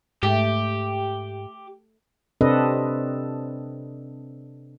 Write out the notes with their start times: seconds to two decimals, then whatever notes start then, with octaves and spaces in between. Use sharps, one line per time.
0.23 G#2 A3 G4
2.41 C3 C4 D4 A4 B4 D#5